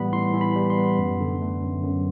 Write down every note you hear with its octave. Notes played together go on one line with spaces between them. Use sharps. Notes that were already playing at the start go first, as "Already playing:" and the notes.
Already playing: A2 E3 G3 B3 B5
A2 C6
E3
B5
G3
C6
B3
F#2
D3
A3
F#2
F#2